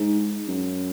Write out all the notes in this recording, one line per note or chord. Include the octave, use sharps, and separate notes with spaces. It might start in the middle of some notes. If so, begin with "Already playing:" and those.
Already playing: G#2
F#2